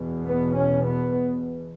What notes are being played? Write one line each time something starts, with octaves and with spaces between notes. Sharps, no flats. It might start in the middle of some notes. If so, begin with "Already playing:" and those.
Already playing: E2 B2
B3
C#4
B3